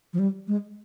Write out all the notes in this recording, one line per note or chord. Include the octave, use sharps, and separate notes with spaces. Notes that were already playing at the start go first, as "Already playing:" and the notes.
F3
G3
G#3